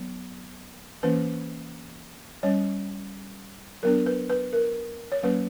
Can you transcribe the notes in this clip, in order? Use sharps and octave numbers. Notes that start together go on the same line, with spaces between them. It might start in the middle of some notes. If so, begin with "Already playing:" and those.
Already playing: F#3 B3
E3 A#3 C#4 B4
G3 C#4 C#5
F#3 B3 D4 A#4
B4
B4
A#4
C#5
F#3 A#3 C#4 B4